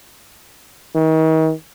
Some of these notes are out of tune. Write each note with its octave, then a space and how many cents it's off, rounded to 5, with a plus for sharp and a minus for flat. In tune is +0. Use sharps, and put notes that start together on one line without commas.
D#3 +40